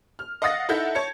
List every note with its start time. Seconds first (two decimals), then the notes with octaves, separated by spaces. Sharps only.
0.19 F6
0.42 D#5 F5 F#5 D#6 A6 A#6
0.69 D#4 E4 A4 E5 F#5 G6
0.95 C#5 A5 G#6 C#7